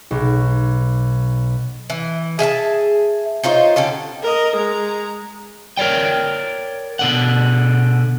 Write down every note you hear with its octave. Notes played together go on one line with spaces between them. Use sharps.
B1
E3
G#4 E5 F5 A5
D#4 F4 C5 C#5
D3 C#4 G4 A4
A#4 D#5
G#3 A#5
A#4 C#5 D5 G5
B2 D3 F#5